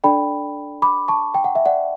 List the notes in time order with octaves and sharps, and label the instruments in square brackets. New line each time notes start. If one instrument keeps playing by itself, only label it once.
[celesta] D4 A4 D5 G5 B5
B5 D6
A5 C#6
G5
F#5
E5
D5 F#5